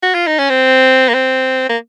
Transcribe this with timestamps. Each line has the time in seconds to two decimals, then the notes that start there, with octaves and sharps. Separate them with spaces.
0.03 F#4
0.14 F4
0.27 D#4
0.39 C#4
0.49 C4
1.09 A#3
1.14 C4
1.69 A#3